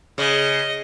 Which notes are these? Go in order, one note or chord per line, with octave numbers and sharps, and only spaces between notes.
C#3 D#5